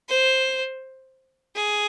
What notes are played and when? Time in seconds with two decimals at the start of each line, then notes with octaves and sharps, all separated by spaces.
0.09 C5
1.56 G#4